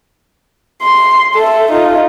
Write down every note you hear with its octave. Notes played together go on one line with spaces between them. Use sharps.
C6
A4 E5
D#4 F4